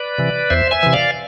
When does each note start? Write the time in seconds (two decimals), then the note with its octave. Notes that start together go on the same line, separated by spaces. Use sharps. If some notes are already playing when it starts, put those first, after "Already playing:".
Already playing: B4 D5
0.18 C3 E3
0.50 E2 C5 E5
0.71 E5 G#5
0.83 C3 E3
0.93 D5 F5